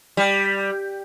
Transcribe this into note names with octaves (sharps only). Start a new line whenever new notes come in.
G3